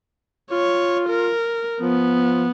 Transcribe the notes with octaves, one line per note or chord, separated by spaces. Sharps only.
F4 C#5
A#4
F3 B3